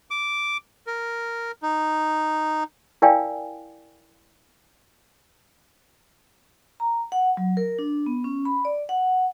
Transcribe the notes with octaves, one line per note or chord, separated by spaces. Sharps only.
D6
A#4
D#4
E4 A#4 D5 F5 G5 G#5
A#5
F#5
F#3
A#4
D4
B3
C#4
B5
D5
F#5